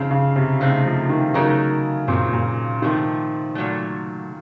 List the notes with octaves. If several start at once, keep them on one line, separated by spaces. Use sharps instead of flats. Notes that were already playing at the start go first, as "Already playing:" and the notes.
Already playing: C#3 F3 C4 D#4
C#3
C3
A2 C#3 A3 C4 D#4
F3
D#3
C#3 F#3 A3 D#4 A#4
A#2 D#3 F#3 C4
A#2
C3 D#3 F3 A3
A#2 F#3 A3